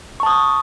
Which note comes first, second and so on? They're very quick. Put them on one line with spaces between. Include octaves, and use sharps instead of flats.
C#6 A5 D#6